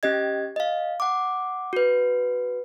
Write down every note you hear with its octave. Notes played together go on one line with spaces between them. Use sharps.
C#4 G4 D#5 G#6
D#5 F5
F#5 D6
F#4 B4